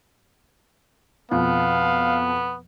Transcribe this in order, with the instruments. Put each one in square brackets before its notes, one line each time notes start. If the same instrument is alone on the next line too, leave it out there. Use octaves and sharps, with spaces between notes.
[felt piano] F2 B2 F4 [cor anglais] B3 [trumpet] F5